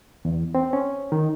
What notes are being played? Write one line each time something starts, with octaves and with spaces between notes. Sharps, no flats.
E2
C4
C#4
D#3